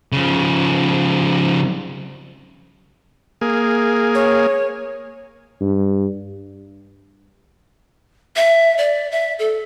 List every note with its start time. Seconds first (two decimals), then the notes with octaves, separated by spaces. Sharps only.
0.12 C#3 F3
3.41 A#3 G#4
4.15 C#5
5.61 G2
8.36 E5
8.78 D5
9.11 E5
9.39 A4